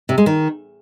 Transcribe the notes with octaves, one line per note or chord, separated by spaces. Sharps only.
C3
G#3
D#3